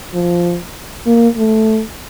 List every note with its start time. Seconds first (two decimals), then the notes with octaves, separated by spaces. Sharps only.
0.14 F3
1.07 A#3
1.37 A3